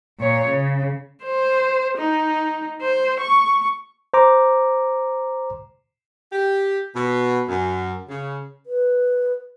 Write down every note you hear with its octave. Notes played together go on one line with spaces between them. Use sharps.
A#2 C#5
C#3
C5
D#4
C5
C#6
C5 A#5 D6
G4
B2
F#2
C#3
B4